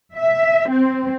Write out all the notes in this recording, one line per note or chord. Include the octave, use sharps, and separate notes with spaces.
E5
C4